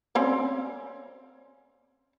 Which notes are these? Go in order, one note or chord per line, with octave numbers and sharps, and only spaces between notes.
C4 C#4 D5